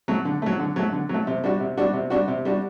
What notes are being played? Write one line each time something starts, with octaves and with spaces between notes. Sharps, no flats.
F#3 A3
D3
F#3 A3
D3
F#3 A3
D3
F#3 A3
C3
G3 D4 F#4
C3
G3 D4 F#4
C3
G3 D4 F#4
C3
G3 D4 F#4